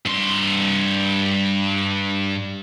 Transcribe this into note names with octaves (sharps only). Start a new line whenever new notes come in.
G2 C6